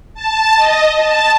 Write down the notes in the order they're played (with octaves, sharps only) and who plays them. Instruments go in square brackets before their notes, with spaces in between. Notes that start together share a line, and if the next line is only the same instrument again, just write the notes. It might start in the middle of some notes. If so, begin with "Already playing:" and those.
[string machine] A5
D#5
A5